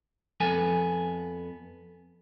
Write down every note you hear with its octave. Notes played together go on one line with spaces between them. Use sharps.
F2 F3 B3 A4 G#5